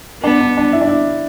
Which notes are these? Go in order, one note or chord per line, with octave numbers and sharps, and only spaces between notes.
B3 D4
D4
D4
E4
D4
E4